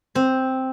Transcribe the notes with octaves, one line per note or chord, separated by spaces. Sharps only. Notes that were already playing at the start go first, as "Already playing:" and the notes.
C4